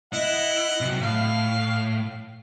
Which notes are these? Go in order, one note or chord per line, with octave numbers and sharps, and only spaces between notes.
E4 D#5 F#5
C3 F#3
A2 F5